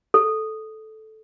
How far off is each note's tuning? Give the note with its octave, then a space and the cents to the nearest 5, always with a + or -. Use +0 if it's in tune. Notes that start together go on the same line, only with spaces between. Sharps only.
A4 -10